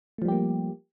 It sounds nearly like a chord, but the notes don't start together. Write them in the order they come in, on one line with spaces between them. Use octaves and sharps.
A3 F3 G3 G4 A#3